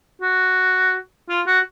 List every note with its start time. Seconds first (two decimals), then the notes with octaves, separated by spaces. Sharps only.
0.22 F#4
1.29 F4
1.47 F#4